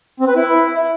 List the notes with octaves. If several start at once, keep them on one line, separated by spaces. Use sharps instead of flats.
C4
B4
E4